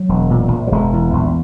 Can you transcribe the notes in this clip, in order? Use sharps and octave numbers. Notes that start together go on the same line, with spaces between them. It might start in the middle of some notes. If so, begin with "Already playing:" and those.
Already playing: F#3
E1
A#2
A#1
F#3
E1 G#3
E2
A#1